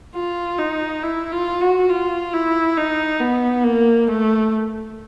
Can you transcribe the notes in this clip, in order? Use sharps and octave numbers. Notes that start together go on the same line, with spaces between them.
F4
D#4
E4
F4
F#4
F4
E4
D#4
B3
A#3
A3